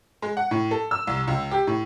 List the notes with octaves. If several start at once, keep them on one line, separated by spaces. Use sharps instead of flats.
G#3
F#5
A2
A4
E6
C2
C#2
G4
A2